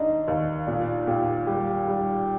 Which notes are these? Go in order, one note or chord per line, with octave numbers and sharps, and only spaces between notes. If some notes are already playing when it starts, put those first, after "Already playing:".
Already playing: D#2 D4 D#4
D#2
A#2 D4
A#2 G4
G3 G4
G3